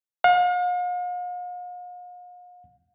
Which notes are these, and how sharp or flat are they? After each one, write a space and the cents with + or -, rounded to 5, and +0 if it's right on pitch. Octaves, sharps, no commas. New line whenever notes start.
F5 +45